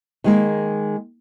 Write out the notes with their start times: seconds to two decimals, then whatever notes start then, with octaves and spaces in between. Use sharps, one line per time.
0.24 D#3 G#3 A#3